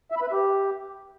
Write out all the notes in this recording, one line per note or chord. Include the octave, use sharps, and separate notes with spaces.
E5
B5
B4
E5
G4